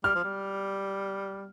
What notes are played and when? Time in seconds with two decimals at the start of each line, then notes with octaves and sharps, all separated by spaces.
0.04 G3 F6
0.15 F3
0.24 G3